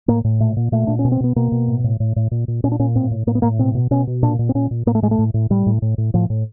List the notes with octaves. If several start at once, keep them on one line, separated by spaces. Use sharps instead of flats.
A2 A#3
A2
A#2 A3
A#2
A#2 A3
A#2 D4
C#4
B2
C4
B2 B3
B2 A#3
B2
A2
A2
A2
A2
A#2
A#2
A#2 C#4
D4
A#2 C#4
A2 C4
A2
A2 A#3
B3
A2 A#3
B2 C4
B2
B2 C#4
B2
A#2 D4
A#2
C4
A#2 C#4
A#2
A2 A#3
A3
A2 G#3
A3
A2
A2
A2 G3
A2
A2
A2
A2 F3
A2